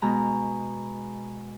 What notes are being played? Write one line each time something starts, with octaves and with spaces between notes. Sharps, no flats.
B2 G#3 A#5